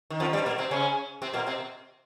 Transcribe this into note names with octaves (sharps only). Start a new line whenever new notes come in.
D#3
F2 F3
G2 G3
A#2 A#3
C3 C4
C#3 C#4
C3 C4
A#2 A#3
C3 C4